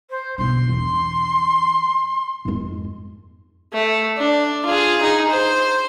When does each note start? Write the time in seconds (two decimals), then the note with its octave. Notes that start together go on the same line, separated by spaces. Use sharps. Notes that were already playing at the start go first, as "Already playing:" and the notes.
0.10 C5
0.38 B1 D3 C6
0.69 E2 D4
2.45 F2 G#2
3.73 A3
4.18 D4
4.66 F4 G#4
5.01 D#4 G#4
5.31 C5